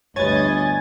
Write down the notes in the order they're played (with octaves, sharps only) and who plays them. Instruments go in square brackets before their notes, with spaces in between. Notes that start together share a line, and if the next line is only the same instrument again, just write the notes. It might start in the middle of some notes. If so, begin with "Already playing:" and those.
[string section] G1 D2 D#5 [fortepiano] B4 C#5 [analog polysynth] G#5 G#6 A6